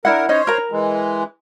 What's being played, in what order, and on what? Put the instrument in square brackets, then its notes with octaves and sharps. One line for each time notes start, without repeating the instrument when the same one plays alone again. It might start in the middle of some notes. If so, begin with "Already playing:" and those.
[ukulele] D4 E4 F#5 [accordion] A#4
[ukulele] C#4 D#4 D#5 [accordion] C5 C#5
[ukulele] A#4 A#5
[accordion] E3 G#3